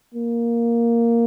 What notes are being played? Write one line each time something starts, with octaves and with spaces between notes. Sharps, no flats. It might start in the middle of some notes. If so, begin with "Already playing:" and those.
A#3